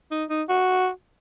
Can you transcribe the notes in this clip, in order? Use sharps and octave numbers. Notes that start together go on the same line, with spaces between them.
D#4
D#4
F#4